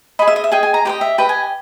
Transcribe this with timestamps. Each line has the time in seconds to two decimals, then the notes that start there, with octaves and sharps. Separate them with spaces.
0.19 G#4 D#5 B5
0.27 E5
0.36 D#5
0.44 E5
0.52 G#4 D#5 G5
0.63 G#5
0.74 A#5
0.85 G4 B4 D#5 G5
1.01 E5
1.18 G4 B4 D#5 G5
1.29 G#5